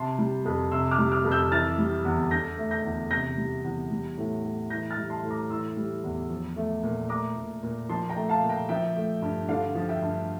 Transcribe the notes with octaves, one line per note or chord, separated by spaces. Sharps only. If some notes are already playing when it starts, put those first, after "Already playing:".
Already playing: C3 A5 C6
G3
F2
C3 C6 E6
D6 F6
G3
D6 F6
F2
E6 G6
E3 F6 A6
G3
E2
D3 G6 A#6
A3
G6 A#6
E2
C3 G6 A#6
G3
E2
G3
A2
A2
E3 G6 A#6
F6 A6
G3
A5 C6
A2
A#5 D6
E3 C6 E6
G3
E2
F3
A3
A#2
A3 A#5 D6
A#2
A#2
F3 A5 C6
G5 A#5
A3
F5 A5
A#2
G5 A#5
F3 E5 G5
A3
G2
D3 D5 F5
F3
E5 G5
G2